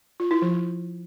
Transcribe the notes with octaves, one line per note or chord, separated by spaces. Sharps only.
F4
E4
F3